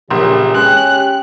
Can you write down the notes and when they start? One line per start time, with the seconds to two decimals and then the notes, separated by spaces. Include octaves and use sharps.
0.10 A#1 A#2 C#3 E3 G4
0.54 G#3 C#4 G5 F#6